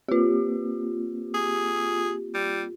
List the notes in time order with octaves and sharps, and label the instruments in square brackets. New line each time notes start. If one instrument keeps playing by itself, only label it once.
[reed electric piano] A#3 C4 [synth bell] F4 G4
[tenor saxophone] G#4
G3